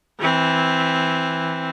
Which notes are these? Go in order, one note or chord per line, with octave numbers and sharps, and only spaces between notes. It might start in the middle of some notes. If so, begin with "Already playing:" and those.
E3 C4